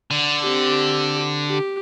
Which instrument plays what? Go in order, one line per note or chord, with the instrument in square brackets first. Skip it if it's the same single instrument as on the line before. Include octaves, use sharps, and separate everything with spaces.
[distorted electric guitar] D3
[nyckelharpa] C4 G4
G4